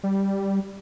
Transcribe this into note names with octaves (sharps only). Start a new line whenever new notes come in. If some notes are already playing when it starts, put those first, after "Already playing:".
G3